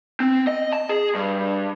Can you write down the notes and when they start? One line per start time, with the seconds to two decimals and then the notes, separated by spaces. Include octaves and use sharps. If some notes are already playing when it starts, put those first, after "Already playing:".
0.20 C4
0.47 D#5
0.72 A5
0.89 G#4
1.15 G2